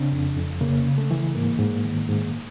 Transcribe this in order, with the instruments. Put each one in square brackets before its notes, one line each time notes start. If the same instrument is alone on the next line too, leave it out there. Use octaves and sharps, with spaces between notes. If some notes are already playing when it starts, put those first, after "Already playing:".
Already playing: [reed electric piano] C#3 C4 D4
F2
F2
C#3 A#3
C#3
A3
E3
G#2 A#3
G#2
D#3
G#2